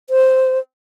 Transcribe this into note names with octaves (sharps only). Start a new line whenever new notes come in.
C5